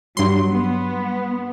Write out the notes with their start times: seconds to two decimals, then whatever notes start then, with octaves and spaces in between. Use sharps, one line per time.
0.17 G2 F#3 C6
0.50 B3